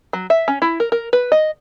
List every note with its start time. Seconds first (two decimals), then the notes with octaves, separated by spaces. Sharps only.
0.13 F#3
0.30 E5
0.48 C#4
0.62 E4
0.80 A#4
0.92 A#4
1.13 B4
1.32 D#5